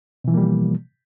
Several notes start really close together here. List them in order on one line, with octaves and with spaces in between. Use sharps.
B2 E3 F3 A#3 G3